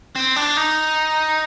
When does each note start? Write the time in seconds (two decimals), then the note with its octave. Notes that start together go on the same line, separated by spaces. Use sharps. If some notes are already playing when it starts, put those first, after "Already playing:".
0.15 C4
0.36 D4
0.57 D#4